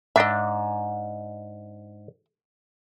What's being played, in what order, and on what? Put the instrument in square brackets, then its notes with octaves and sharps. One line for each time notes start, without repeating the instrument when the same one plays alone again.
[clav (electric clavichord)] G#2 D4 [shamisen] D#5 E5